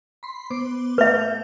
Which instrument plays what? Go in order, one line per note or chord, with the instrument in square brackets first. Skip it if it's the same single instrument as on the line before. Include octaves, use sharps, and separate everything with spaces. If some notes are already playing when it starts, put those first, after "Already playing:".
[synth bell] B5 C6
B3 C5 D6
[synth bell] A3 G6 F7 [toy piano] B4 E5